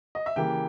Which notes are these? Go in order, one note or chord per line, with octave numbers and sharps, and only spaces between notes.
D#5
E5
C#3 E3 A#3 G4 G5